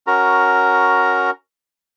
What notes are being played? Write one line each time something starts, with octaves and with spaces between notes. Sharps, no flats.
C#4 F#4 A#4 A#5